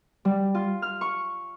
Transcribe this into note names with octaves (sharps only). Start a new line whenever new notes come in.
G3
F4
F6
C#6